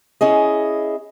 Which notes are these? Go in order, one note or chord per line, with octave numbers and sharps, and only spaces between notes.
C#4 E4 G#4 D#5